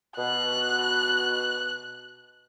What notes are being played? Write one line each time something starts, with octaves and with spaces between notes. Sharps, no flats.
B2 F#6